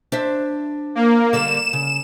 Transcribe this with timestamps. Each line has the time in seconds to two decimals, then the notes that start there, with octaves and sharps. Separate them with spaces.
0.12 D4 C5 E5
0.95 A#3
1.33 D3 G3 A#3 E7
1.73 C#3